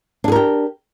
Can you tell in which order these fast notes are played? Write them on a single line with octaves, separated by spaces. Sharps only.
D4 G#4 A#4 G4